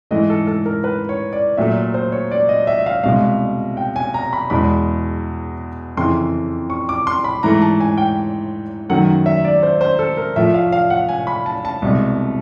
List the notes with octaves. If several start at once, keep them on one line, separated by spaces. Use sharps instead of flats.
G#2 E3 A3 D#5
A4
A4
A#4
B4
C#5
D5
A#2 F#3 A3 E5
C5
C#5
D5
D#5
E5
F5
C2 B2 G#3 F5
G5
G#5
A#5
B5
E2 B2 G#3 B5
F2 C#3 E3 C6
C#6
D6
C6
B5
G#2 E3 A3 A#5
A5
G#5
G5
F#2 D#3 F#3 A3 F#5
E5
D5
C5
C5
A4
A#4
A2 F3 A3 E5
F5
F5
F#5
G#5
B5
A5
A5
C2 B2 G#3